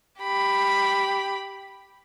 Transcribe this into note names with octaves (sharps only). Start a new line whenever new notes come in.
G4 B5